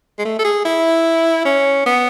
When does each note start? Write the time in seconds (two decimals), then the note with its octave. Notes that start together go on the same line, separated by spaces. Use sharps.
0.19 G#3
0.25 A3
0.39 A4
0.45 G#4
0.65 E4
1.45 C#4
1.86 B3